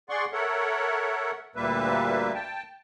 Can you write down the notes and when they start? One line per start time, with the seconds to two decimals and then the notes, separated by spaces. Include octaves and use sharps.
0.09 G#4 D5 F#5 C6 C#6
0.33 A4 A#4 C#5 E5 F#5
1.56 D2 A#2 G3 A#3 B4 E5
2.34 G5 A5